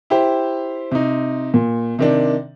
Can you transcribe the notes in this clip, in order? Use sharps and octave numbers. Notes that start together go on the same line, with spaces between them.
E4 G4 C5
C3 D#4
A#2
C3 D#3 D4